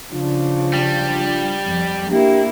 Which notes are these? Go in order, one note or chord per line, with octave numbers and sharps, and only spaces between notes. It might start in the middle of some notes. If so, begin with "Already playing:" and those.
C#3 F3 D4 F4
G3
F2
A#3 D4 E4 G4